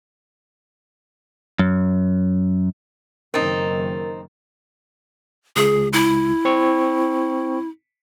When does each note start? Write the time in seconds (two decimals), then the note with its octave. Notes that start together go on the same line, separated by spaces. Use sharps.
1.59 F#2
3.34 F#1 D#3 C4 D#4 A#4 A6
5.56 C#2 G#4
5.93 E4
6.45 C4 C#6